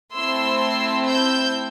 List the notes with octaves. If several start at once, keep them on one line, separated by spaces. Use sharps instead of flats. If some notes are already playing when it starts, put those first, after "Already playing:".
A3 C4 E4 C6 E6
E6 G6